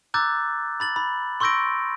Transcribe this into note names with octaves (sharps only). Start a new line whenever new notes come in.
A#5 D6 E6 F#6 G6 A6
B5 A6 F#7
B5
C6 C#6 E6 G6 A#6 D7